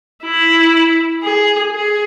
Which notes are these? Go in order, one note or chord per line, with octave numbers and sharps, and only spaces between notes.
E4
G#4
G#4